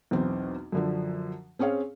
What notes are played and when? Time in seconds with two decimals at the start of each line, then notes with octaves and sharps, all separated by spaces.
0.11 B1 E2 C4
0.72 F#2 D3 F3
1.59 C4 C#4 G#4 C#5 F5